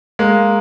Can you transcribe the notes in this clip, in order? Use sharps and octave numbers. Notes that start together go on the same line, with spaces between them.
G#3 A#3